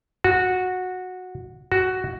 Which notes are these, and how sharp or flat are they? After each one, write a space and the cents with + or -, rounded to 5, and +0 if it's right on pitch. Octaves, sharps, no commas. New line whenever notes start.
F#4 -10
F#4 +10